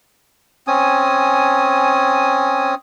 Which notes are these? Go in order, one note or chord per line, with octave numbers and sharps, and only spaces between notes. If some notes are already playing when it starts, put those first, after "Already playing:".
C4 C#4 G#5 D#6